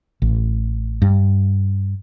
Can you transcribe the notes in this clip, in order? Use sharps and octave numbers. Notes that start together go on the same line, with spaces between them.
A1
G2